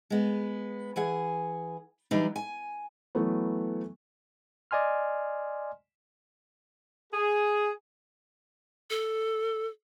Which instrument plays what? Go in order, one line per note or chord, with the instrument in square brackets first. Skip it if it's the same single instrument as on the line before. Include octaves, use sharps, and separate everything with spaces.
[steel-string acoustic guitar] G#3 B3
E3 G#4 F#5 G#5
E3 F#3 G3 D4 D#4
G#5
[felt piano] E3 F#3 A3 B3
[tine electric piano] D5 D#5 G#5 C6 F6
[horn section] G#4
[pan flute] A4